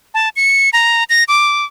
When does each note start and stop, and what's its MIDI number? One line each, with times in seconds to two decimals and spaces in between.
0.14 0.29 81
0.36 0.70 97
0.73 1.04 82
1.10 1.24 94
1.28 1.65 86